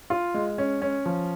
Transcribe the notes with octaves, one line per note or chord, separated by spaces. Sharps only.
F4
G#3
C#4
C#4
F3